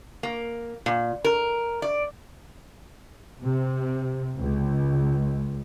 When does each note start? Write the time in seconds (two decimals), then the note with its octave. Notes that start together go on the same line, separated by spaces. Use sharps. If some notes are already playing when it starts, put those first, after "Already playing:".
0.23 A#3
0.86 A#2
1.24 A#4
1.82 D5
3.41 C3
4.36 C#2